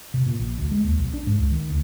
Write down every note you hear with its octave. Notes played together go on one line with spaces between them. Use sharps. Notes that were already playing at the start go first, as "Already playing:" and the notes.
C3
A#2
A#1
D2
G#3
D#2
B1
D4
G#2
C#2
D#3
D2